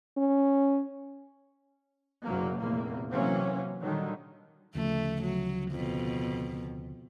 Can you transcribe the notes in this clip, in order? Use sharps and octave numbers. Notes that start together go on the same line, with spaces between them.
C#4
F#1 B1 F#3 A#3
F1 E2 A#2 A#3
C3 E3 F#3 A#3 C4 C#4
A#2 D3 D#3 F#3 G3
D2 C#3 F3 A3
F#3
F2 B2